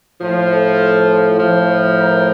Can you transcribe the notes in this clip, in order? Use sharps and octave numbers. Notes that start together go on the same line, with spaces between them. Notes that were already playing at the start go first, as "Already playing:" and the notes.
A2 F3
A4
A2 F3
A#4